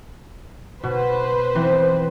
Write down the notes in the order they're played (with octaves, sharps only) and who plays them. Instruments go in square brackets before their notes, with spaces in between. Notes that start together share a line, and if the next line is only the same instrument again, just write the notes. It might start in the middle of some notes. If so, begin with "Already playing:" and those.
[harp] B2 [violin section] B4 C5
[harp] E3 C4